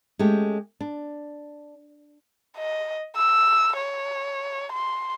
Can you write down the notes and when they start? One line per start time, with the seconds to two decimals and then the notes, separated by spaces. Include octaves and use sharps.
0.19 G#3 A3 C#4 G4
0.81 D4
2.56 D#5
3.16 E6
3.76 C#5
4.72 C6